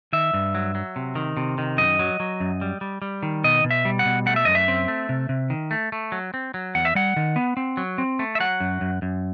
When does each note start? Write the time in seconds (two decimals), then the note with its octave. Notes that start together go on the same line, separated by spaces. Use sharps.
0.13 D#3 E5
0.34 G2
0.55 F#3
0.75 F#3
0.96 C3
1.15 D#3
1.37 C3
1.58 D#3
1.78 F#2 D#5
1.99 F#3
2.20 F#3
2.40 F#2
2.61 G3
2.81 G3
3.02 G3
3.23 D#3
3.44 B2 D#5
3.64 B2
3.71 E5
3.85 G3
3.99 F#5
4.06 B2
4.26 A3 F#5
4.36 E5
4.45 F#2 D#5
4.55 E5
4.68 C4
4.88 A3
5.09 C3
5.29 C3
5.50 D#3
5.71 A3
5.92 A3
6.12 F#3
6.34 C4
6.54 F#3
6.75 E2 F#5
6.85 E5
6.95 G3 F#5
7.16 D#3
7.36 B3
7.57 C4
7.77 F#3
7.98 C4
8.19 A3
8.35 E5
8.40 F#3 F#5
8.60 F#2
8.81 F#2
9.02 F#2